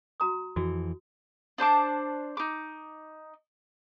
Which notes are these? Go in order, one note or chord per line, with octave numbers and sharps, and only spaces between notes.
F#4 A#5 D#6
F2 E3 F#4
D4 C5 A5 D6
D#4 D6